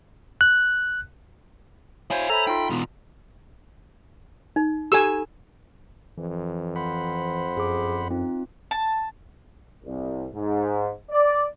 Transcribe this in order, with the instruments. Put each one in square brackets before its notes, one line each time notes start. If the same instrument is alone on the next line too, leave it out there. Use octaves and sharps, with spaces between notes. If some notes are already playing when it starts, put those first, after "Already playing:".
[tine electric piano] F#6
[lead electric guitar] E4 F5 [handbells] C5 C#5 G#5
[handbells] A4 E5 B5 [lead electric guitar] A#5
[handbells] D#4 F4 [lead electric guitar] G5
[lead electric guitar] E2 B2
[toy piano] D#4
[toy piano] G4 A4 A#5 [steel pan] G#5 E6
[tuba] F2 [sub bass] E3
[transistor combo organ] C5 F#5 B5
[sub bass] F#2 [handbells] G#4 D6
[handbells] C4 D#4 F4
[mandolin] A5
[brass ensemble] C2
G#2
D5